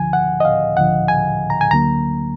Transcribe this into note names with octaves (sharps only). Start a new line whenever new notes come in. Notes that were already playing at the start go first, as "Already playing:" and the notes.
Already playing: D2 D3 F3 G#5
F#5
D#5
F5
D2 D3 F3 F#5
G#5
A#5
G#5
D2 D3 F#3 A#3 A#5